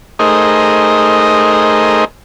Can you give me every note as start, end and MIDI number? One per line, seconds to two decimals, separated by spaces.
0.19 2.05 57
0.19 2.05 63
0.19 2.05 68
0.19 2.05 70
0.19 2.05 72
0.19 2.05 75